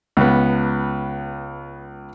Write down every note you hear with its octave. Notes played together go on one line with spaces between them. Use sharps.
C#2 B3